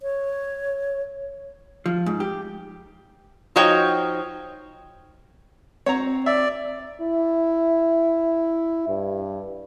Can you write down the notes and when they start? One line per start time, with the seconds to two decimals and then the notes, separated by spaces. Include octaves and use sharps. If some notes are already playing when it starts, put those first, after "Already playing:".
0.02 C#5
1.86 F3
2.06 G#2
2.20 G4
3.56 F3 D#4 F#4 C#5 G5
5.86 C4 C#5 F#5 A#5
6.26 D5 E5
7.01 E4
8.88 G2